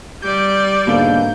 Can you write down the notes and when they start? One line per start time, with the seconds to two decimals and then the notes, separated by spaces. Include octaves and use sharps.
0.22 G3 D5 G6
0.87 G#2 B2 D3 A#3